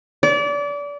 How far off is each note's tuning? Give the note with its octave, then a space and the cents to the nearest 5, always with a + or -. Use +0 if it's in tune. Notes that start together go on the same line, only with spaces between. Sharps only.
D5 -30